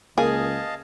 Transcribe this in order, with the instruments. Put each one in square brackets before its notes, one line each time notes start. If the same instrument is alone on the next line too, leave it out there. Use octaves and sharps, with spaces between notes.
[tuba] C#2 [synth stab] A#3 [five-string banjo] G#4 [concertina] D#5 F5 A5